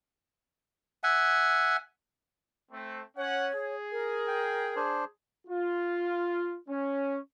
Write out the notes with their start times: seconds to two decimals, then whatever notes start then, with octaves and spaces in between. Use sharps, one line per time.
1.03 E5 F#5 G#5
2.72 A3 C4
3.17 C#4 C#5 F#5
3.55 G#4
3.92 A#4
4.27 G5
4.76 D4 C5
5.48 F4
6.68 C#4